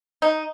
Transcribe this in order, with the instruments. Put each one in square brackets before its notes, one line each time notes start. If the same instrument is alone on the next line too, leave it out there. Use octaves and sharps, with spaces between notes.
[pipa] D#4